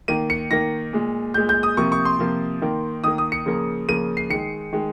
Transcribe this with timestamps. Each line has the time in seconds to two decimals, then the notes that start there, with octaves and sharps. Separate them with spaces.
0.08 D#3 A#3 D#7
0.30 C#7
0.51 D#3 A#3 A#6
0.93 A#2 G#3
1.34 A#2 G#3 G6
1.49 G6
1.63 D#6
1.77 C3 F3 A#3 C#6
1.92 C#6
2.05 C6
2.19 C3 F3 A#3
2.62 D#3 A#3
3.04 D#3 A#3 D#6
3.18 D#6
3.32 C#7
3.46 C#3 F3 A#3
3.88 C#3 F3 A#3 D#7
4.17 C7
4.30 D#3 G#3 C#7
4.73 D#3 G#3